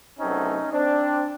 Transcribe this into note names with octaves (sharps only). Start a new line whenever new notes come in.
C2 B2 F#3 A3 C4 C#4 D#4
C4 D4